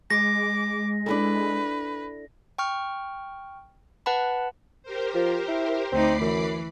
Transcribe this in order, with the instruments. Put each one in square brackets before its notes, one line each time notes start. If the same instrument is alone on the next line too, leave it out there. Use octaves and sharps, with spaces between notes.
[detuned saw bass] G#3 [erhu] D6 [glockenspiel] A#6
[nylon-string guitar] D4 E4 A4 [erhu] B4
[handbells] G5 C#6 F6
B4 F#5 A5 B5
[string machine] G4 A#4 C5
[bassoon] F3
E4
[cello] D2 D#4 [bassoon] C4 [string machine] B5 D6 C7
[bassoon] F#2 [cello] E3